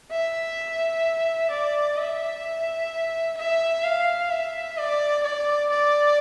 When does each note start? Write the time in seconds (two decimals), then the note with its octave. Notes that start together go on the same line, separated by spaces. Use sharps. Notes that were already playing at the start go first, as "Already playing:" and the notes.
0.11 E5
1.51 D5
1.97 E5
3.38 E5
3.84 F5
4.30 E5
4.77 D5
5.24 D5
5.70 D5